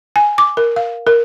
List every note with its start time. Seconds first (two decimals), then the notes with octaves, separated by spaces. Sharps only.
0.16 G#5
0.38 D6
0.57 A#4
0.76 F5
1.07 A#4